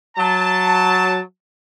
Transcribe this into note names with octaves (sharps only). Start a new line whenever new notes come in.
F#3 A5